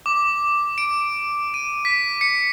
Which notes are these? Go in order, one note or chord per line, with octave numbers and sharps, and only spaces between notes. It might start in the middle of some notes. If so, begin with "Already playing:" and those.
D6
D7
D#7
B6
C#7